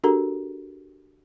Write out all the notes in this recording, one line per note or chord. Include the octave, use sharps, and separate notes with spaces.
D4 F#4 G4 A4 A#4 A#5